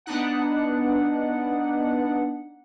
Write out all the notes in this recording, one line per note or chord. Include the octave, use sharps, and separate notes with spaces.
B3 D4 D#4 F#5